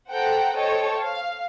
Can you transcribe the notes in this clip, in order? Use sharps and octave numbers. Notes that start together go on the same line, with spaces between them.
A4 C5 F#5 G5 A#5 F#6
A4 C5 C#5 D#5 G5 A5
F5